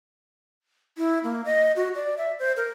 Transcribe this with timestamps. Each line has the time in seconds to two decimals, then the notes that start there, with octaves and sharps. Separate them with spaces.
0.98 E4
1.24 A#3
1.45 D#5
1.76 F#4
1.95 D5
2.18 E5
2.39 C5
2.57 A#4